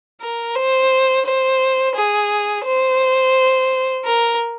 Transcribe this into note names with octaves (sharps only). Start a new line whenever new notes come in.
A#4
C5
C5
G#4
C5
A#4